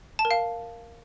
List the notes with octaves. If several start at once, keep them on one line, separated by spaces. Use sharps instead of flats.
A5
A#4
F5